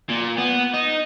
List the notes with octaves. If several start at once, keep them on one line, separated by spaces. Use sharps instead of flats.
A#2
B3
D#4